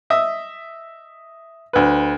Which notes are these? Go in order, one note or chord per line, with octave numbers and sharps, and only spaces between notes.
D#5 E5 D#6
D2 B4